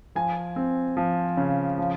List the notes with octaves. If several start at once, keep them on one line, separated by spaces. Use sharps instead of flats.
F3 G#5
C4
F3
C#3
F3